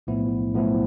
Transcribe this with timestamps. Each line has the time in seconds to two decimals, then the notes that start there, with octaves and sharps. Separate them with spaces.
0.07 B1 A2 F3 B3 E4
0.54 B1 A2 F3 B3 E4